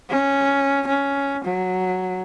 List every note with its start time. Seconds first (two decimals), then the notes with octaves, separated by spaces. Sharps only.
0.10 C#4
0.87 C#4
1.44 F#3